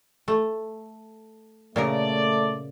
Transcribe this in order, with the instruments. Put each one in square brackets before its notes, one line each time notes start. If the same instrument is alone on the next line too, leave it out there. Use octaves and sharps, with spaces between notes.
[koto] A3
[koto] A#2 C#3 A#4 [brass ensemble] A3 D5